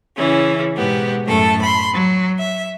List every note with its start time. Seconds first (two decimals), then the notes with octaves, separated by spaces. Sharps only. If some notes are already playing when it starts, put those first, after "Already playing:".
0.16 C#3 E3 C#4
0.77 G#2 B2 B3 G4
1.26 F#2 A2 A3 A4
1.61 B5 C6
1.93 F#3
2.38 E5